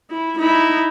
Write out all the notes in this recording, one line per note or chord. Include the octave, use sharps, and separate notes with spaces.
E4
D#4 E4